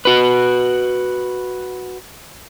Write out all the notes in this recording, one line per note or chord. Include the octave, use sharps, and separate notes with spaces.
F#4 B4